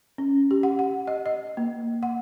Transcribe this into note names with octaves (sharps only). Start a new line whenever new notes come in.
C#4
G4
F#5
F#5
D#5
D#5
A#3
F#5